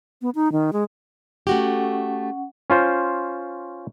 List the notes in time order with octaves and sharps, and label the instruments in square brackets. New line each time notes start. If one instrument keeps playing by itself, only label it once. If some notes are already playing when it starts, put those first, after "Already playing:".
[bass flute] B3
D#4
D#3
G#3
[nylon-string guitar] A3 F#4 G4 [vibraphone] C#4 F#5
[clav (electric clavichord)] C#4 F4 C5